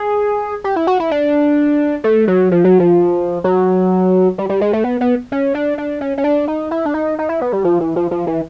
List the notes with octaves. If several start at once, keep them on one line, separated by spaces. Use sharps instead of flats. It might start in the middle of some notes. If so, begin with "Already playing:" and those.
Already playing: G#4
G4
E4
F#4
E4
D4
A3
F#3
F3
F#3
F3
F#3
G3
G3
G#3
A3
B3
B3
C#4
D4
D4
C#4
C#4
D4
D#4
E4
D4
D#4
D#4
E4
B3
G3
F3
E3
F3
F3
E3